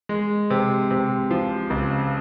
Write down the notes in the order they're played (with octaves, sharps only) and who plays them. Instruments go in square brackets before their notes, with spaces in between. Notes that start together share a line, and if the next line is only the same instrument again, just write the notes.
[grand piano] G#3
C3
C3
F3
C#2